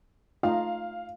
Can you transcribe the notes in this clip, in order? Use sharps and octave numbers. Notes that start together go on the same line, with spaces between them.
A3 D#4 F4 F5